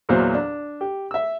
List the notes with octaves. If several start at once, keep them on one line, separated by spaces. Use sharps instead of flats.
E2 A#2 F#3 C5
D4
G4
E5 E6